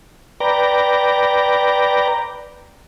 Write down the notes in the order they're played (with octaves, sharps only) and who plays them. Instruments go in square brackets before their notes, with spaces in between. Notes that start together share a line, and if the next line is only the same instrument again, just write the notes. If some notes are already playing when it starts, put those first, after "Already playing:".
[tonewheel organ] B4 D5 G5 A#5